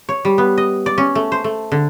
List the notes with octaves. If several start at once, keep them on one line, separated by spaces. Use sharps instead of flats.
C#5
G3
B3
D#5
D5
C#4
A3
C5
A3
D3